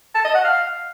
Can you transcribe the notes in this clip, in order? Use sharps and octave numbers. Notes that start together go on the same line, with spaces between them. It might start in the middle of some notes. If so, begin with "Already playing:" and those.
A5
D#5
F#5
F5